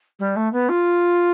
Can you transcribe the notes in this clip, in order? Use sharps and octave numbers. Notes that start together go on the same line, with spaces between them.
G3
A3
B3
F4